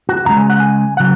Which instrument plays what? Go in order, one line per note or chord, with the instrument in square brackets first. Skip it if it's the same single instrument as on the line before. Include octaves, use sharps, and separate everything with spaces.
[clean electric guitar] F#4
F#2 C#3 G#3 A#5
G#5
F#5
G#5
C#3 F#3 F#5